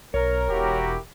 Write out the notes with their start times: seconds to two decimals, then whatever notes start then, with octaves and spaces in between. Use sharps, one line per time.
0.14 B1 A#4 C#5
0.49 E1 E4 F#4 G4